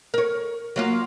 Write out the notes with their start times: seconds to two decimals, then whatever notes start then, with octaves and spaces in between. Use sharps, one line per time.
0.14 A#4 C#5
0.76 F#3 A#3 F4